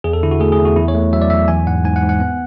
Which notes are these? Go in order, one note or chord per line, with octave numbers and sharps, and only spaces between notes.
E2 G#4
A4
D3 E4
F#4
A3 G#4
G#4
E2
F#4
E2 E4
C#5
A3
F#3 E5
D5
E2 E5
E3 G#5
G#2 F#5
G#2 G#5
F#5
G#2
F#5
B3